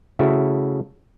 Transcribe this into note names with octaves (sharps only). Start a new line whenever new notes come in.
C#3 A3 E4 F#4